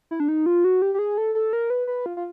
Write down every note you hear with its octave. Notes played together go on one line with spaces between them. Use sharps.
E4
D4
D#4
F4
F#4
G4
G4
G#4
A4
A4
A#4
B4
B4
F4
F4